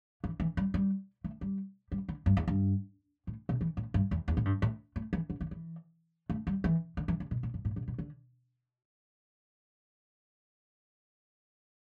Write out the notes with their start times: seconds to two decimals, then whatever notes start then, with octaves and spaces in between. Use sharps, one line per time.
0.24 E3
0.40 E3
0.57 G3
0.74 G3
1.24 A3
1.41 G3
1.92 G3
2.09 D3
2.26 G2
2.37 E2
2.48 G2
3.27 A2
3.49 B2
3.61 E3
3.77 A2
3.94 G2
4.11 E2
4.28 E2
4.37 A2
4.45 G2
4.62 A2
4.96 A3
5.13 E3
5.30 D3
5.41 D3
5.51 E3
6.30 A3
6.47 G3
6.64 E3
6.97 D3
7.08 E3
7.20 D3
7.31 B2
7.43 A2
7.54 G2
7.65 A2
7.76 B2
7.88 B2
7.99 D3